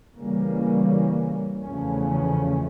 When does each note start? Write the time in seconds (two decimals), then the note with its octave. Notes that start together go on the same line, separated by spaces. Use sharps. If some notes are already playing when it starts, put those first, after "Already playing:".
0.17 C#3 E3 G3 A#3 C#4
1.64 E2 C#3 F3 A3 C#4